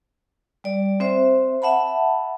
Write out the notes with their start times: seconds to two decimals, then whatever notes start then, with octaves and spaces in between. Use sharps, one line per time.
0.64 G3 D5
1.00 C4 C5 E5
1.62 E5 F#5 A5 B5